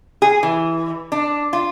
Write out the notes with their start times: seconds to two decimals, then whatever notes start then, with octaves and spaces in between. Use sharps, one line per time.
0.22 G#4
0.43 E3
1.12 D4
1.53 F4